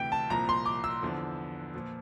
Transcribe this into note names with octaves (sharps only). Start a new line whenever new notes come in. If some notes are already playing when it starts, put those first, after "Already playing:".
Already playing: D2 C3 E3 G5
A5
C2 A#2 F3 A#5
C6
D6
E6
E2 D3 F3
A#2 F3